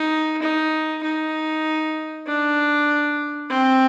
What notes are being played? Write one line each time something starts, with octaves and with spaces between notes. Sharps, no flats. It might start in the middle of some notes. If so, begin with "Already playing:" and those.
Already playing: D#4
D#4
D#4
D4
C4